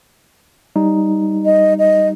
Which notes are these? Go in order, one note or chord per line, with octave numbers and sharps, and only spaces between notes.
G3 D#4
D#5
D#5